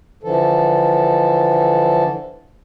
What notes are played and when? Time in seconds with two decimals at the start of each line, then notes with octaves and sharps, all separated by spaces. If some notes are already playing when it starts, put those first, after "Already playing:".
0.23 D3 E3 F3 A4